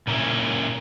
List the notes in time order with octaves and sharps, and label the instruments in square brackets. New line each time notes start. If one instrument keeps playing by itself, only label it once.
[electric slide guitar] A#2 A#3 C#4 E4